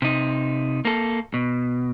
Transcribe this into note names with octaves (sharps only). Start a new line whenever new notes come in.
C3 D#4
A#3 A4
B2